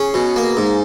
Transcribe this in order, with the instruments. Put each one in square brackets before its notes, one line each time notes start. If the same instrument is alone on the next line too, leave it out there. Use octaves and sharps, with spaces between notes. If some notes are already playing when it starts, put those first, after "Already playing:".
Already playing: [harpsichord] C#4 [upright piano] G#4
[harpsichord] B2
A#3
G#2